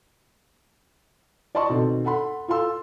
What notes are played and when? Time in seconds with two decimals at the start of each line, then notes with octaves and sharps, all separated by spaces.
1.55 D5 D#5 A5 C6 C#6
1.69 B2 D#3 C4 A4
2.05 A4 F#5 B5 C6
2.48 F4 A4 F5 C6 E6